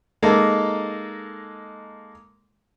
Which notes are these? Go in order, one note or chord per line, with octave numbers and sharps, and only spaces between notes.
G#3 A#3 D#4 A4